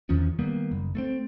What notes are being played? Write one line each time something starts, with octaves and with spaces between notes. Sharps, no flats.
E2 D#3 F3 C#4
D#3 G3 A#3 B3
F#1
A3 A#3 C4